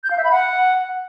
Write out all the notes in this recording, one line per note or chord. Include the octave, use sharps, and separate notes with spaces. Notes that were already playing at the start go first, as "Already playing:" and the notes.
G6
F5
E5
B5
F#5